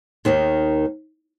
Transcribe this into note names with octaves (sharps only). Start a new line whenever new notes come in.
D#2 D#3 A#3